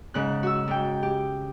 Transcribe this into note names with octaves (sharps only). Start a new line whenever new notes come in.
G#2 C#3 F#6
F#4 E6
G#2 G5
G4